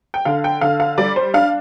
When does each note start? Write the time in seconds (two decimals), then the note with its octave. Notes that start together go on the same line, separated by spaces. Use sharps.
0.14 G5
0.25 D3 F5
0.44 G5
0.61 D3 F5
0.80 F5
0.98 G3 D5
1.16 C5
1.34 D4 F5